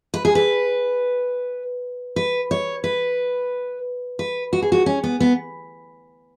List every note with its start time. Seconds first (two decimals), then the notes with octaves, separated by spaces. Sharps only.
0.14 B4
0.25 G#4
0.35 B4
2.16 B4
2.51 C#5
2.84 B4
4.19 B4
4.53 F#4
4.62 G#4
4.72 F#4
4.86 C#4
5.04 B3
5.20 B3